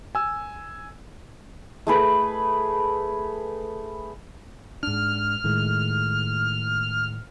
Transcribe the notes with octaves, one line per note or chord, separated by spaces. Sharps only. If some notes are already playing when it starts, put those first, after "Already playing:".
G#5 E6
A3 G#4 B4
G#2 D4 F6
A2 D#3 G#3